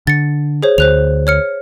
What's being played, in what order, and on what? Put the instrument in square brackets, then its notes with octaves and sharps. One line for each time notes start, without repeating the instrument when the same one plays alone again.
[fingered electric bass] D3 [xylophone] A6 C#7
[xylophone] G#4 C5 C#5
[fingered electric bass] D2 [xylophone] C5 F#6 F7
[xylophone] C#5 F6 C#7